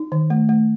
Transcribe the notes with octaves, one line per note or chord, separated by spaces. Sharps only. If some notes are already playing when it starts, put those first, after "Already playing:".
Already playing: D#4
D#3
A3
A3